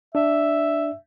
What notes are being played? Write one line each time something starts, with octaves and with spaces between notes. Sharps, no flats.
D4 D5 E5